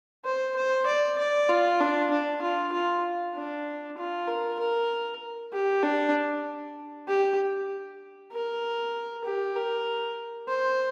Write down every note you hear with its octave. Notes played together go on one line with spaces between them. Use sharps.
C5
C5
D5
D5
F4
D4
D4
F4
F4
D4
F4
A#4
A#4
G4
D4
G4
A#4
G4
A#4
C5